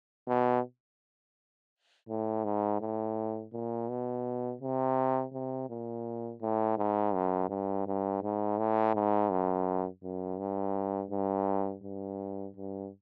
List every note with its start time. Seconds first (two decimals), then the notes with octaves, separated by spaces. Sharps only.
0.28 B2
2.09 A2
2.45 G#2
2.81 A2
3.53 A#2
3.89 B2
4.61 C3
5.33 C3
5.70 A#2
6.42 A2
6.78 G#2
7.14 F#2
7.50 G2
7.87 G2
8.23 G#2
8.58 A2
8.95 G#2
9.30 F#2
10.04 F#2
10.39 G2
11.11 G2
11.84 G2
12.56 G2